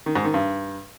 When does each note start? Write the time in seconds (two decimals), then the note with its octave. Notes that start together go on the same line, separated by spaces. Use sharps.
0.06 D#3
0.15 G#2
0.25 D#3
0.34 G2